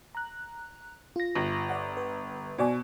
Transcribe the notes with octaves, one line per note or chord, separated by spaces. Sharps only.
A#5 F#6
F4 A#6
G1
D5 F#5
B4
B2 C5 D5 G#5